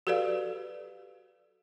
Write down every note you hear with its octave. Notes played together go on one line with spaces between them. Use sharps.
F#4 G4 A4 B4 D5 F5